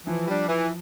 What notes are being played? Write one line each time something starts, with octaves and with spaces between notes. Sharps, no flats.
E3 F3
G3 D4
E3